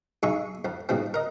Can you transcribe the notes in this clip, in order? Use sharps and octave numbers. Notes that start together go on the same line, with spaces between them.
B1 G#3 D#4 G#4 E5 C#6
F2 F3
G#2 B2 F3 G3 C4
A#4 D#5